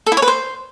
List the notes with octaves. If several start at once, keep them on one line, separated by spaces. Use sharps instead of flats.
A4
E4
C#5
B4
C5